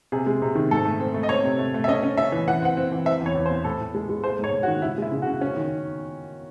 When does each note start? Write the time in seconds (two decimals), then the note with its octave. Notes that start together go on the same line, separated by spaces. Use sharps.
0.12 C3 G#4
0.26 G#3
0.42 C3
0.55 D#3
0.71 G#2 A4
0.85 A3
1.00 C4
1.14 A3
1.23 D#5
1.29 C4 C#5
1.44 C3
1.59 A3
1.74 A3
1.84 E5
1.88 C#4 D#5
2.03 C#4
2.17 C#4 E5
2.32 E3
2.48 E3 F#5
2.62 C4 F#5
2.77 C4
2.92 E3
3.06 C4 E5
3.21 E2 C#5
3.35 E2
3.46 C5
3.51 C4
3.64 A2 A4
3.80 A2
3.95 G#3
4.09 G#3
4.24 A3 C5
4.38 G#2
4.44 C#5
4.53 G#2
4.63 F#4
4.68 D#3
4.82 C#3 E4
4.98 G#3 E4
5.12 C#3
5.22 C#3 F#4
5.41 C#4
5.57 D#3